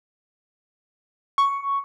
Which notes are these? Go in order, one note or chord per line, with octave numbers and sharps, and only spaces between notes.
C#6